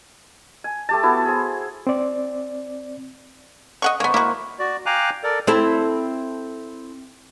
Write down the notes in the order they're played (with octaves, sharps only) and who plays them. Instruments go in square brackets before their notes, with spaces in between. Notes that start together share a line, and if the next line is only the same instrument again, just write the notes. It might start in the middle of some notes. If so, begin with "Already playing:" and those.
[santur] G#5
A3 G4 A5
B3 E4 F#4 A4
G#4 C5
[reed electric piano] C4 D5
[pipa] D#5 F#5 C#6
[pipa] A#3 B3 [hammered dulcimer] C5 A#5 C#6
[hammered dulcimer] A#3 [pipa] E4 F#4
[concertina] F#4 D5
F5 G5 G#5 A#5 D6 F#6
A4 A#4 D5
[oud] C4 E4 A4